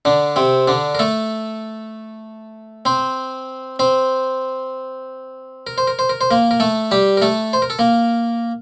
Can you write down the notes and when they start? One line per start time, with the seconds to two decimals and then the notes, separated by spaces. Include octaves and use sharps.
0.05 D3 D4
0.36 C3 C4
0.68 D3 D4
0.95 A#4
0.99 A3 A4
2.85 C4 C5
3.79 C4 C5
5.67 A#4
5.78 C5
5.87 A#4
5.99 C5
6.09 A#4
6.21 C5
6.31 A#3 A#4
6.51 A#4
6.60 A3 A4
6.91 G3 G4
7.17 A#4
7.22 A3 A4
7.53 C5
7.62 A#4
7.70 A4
7.79 A#3 A#4